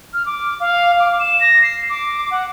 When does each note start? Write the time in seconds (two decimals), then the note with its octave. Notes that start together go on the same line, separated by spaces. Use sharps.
0.14 F6
0.26 D6
0.60 F5
0.99 D6
1.20 E7
1.41 A#6
1.62 C7
1.90 D6
2.31 F#5